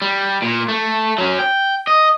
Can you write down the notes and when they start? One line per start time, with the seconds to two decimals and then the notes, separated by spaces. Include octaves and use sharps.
0.02 G3
0.42 A#2
0.69 A3
1.18 F#3 C#4
1.39 G5
1.87 D#5